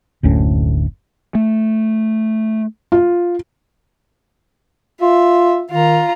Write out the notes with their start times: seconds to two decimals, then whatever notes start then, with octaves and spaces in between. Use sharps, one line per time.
0.23 F#1 D2 A2 C#4
1.35 A3
2.92 F4
5.02 F4 E5
5.72 D#3 F4 A#5